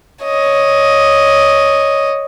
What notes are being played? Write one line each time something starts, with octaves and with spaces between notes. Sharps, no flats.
C#5 D#5